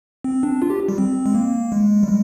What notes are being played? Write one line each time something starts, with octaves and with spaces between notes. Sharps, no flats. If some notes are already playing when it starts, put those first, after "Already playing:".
C4
D4
F4
G4
G3
C4
G#3
A#3
G#3
G3
G#3